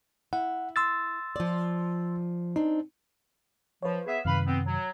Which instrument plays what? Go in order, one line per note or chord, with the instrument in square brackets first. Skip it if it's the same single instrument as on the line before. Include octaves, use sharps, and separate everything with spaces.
[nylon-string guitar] E4 [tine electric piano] F#5
[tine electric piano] C6 E6 A6
[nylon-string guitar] F3 D5
[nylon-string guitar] C4 D4 [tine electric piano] D#4
[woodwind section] F3 [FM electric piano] B4 C#5
[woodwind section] B3 G#4 E5
[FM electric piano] F#2 C3 D#3 [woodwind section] B4 F5 B5
[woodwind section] B3 C4
F#3